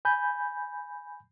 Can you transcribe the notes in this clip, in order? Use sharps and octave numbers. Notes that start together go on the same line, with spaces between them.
G#5 B5 G6